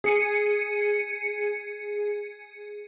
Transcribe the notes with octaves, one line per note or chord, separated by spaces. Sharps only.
G#4 C#7 D#7